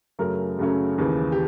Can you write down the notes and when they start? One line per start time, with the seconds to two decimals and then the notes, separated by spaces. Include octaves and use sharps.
0.19 F#2 C#3 F#3 A3 C#4 A#4
0.59 F#2 C#3 F#3 A3 C#4
0.98 D#2 C#3 E3
1.32 G4